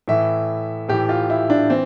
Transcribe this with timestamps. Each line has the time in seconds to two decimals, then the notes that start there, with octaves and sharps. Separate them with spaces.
0.08 A2 E3 E5
0.89 A2 E3 G4
1.09 F4
1.30 E4
1.50 D4
1.69 E3 C4